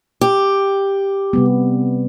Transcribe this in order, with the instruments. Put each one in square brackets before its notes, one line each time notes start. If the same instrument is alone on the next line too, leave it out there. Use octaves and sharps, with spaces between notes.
[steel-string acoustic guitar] G4
[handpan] C3 G3 B3